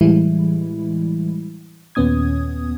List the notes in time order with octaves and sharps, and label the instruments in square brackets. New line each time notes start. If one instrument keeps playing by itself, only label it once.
[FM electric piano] A2 E3 G3 G#3 E4
D#2 A#2 B3 C#4 D#6 G#6